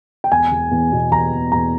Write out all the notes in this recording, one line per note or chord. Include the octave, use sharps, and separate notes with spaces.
G5
E1 G#5
E1
E2
B2
E1 A#5
E1
E2 A#5